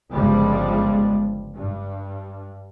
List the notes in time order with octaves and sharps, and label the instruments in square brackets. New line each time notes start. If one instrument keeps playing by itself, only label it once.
[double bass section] G1 C#2 G2 F3 G3 G#3
G2